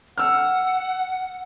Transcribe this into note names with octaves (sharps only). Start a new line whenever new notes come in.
F#5 E6 F6